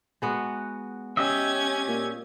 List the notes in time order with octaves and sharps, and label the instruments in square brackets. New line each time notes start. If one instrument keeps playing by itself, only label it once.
[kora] G#3 B3 F#4
[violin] C#4 G#6 [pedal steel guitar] G4 D#5 E5
[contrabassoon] A#2